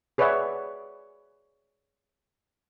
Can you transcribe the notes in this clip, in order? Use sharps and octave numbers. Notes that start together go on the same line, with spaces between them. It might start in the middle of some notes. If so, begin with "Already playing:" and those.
G#4 B4 C#5 D5 E5 F#5